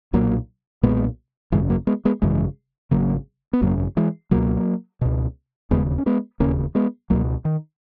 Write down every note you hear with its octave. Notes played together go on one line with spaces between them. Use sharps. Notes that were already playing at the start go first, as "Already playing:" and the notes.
B1 A#2 F#3 A#3
B1 A#2 G#3 B3
G#1 F#2 C#3 E3 G#3
F#3 A#3
G#3 B3
G#3 B3
G#1 F#2 C#3 E3 G#3
G#1 F#2 C#3 F#3 A#3
B3
G#1 F#2 C#3 F#3 A#3
E3 G#3
C#2 B2 F#3 A#3
C#2 B2
E1 D#2 C#3 G#3 B3
C#4
G#3 B3
E1 D#2 C#3 A#3 C#4
G#3 B3
C#2 B2 F#3 A#3
D#3